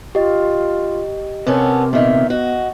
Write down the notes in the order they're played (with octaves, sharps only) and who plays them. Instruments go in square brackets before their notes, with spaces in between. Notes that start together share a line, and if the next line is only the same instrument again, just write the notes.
[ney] F4 [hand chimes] G4 D#5
[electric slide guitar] C3 [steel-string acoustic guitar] B3 C#4 A4 [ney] A#4
[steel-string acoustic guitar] A#2 D#3 [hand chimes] B3 [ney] E5
[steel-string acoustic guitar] F#4 [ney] D#5